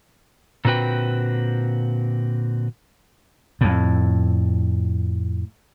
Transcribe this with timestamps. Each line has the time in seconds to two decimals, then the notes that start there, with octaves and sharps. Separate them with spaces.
0.65 A#2 D3 C4 F#4 B4 G5
3.61 F2 A2